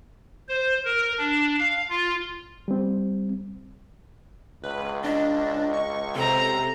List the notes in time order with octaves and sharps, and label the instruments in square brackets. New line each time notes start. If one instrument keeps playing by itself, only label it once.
[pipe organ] C5
A#4
D4
F5
F4
[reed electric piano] G3 C4
[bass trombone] C#2 [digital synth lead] B4
[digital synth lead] D4 [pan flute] D#5
[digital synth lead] C#6
[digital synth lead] C3 [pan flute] A4 [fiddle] C5 A#5